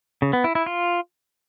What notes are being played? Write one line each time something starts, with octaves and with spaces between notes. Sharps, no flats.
C#3
B3
E4
E4
F4